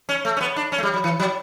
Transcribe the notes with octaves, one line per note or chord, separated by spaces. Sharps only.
C#4
A3
C#4
B3
D4
C#4
A3
G3
F#3
E3
F#3